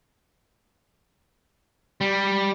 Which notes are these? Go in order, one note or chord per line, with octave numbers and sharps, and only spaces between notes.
G3